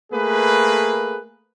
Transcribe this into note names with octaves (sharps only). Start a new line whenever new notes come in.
A3 A#3 G#4 B4